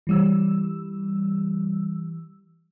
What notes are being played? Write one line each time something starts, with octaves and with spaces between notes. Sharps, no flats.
E3 G3 E6